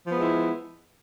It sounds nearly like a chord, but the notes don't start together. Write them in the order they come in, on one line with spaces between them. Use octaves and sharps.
F3 B3 G#3 E4